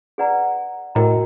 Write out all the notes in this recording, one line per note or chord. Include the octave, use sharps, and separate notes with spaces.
G#4 B4 D5 F#5 A#5
A2 F#4 A#4 D#5 G5 A#5